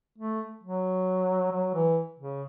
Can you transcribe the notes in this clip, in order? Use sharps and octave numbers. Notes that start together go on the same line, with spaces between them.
A3
F#3
F#3
E3
C#3